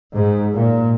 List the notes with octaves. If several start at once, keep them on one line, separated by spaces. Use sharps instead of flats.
G#2
A#2